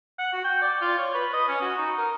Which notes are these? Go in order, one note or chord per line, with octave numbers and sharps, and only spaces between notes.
F#5
F#4
G5
D5
F4
C#5
B4
D#5
C#4
F#4
D#4
A#4